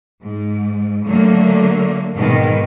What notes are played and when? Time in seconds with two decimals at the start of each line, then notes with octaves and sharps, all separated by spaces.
0.23 G#2
1.06 D3 F#3 A3 A#3
2.14 G#2 B2 D#3